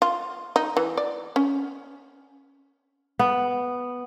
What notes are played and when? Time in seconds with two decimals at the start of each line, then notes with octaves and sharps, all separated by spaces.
0.02 F4
0.56 D#4
0.77 E3
0.97 D5
1.36 C#4
3.19 B3